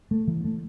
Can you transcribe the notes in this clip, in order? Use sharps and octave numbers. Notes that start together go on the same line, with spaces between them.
A3
E3
A3